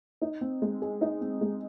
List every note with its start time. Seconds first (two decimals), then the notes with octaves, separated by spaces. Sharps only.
0.22 D#4
0.41 C4
0.62 G#3
0.82 G#4
1.01 D#4
1.21 C4
1.41 G#3